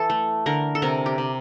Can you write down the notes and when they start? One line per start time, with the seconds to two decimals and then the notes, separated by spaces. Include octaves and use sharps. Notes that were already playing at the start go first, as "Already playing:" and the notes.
Already playing: E3 A4
0.10 A3
0.46 D3 A#4
0.75 A4
0.82 C3 A#4
1.06 G4
1.18 C3